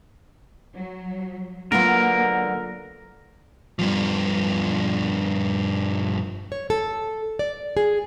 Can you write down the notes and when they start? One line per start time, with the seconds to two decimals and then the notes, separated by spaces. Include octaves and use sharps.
0.75 F#3
1.72 D3 F#3 A#3 B3 F4 A#4
3.79 G2 F3
6.52 C#5
6.70 A4
7.39 D5
7.77 G#4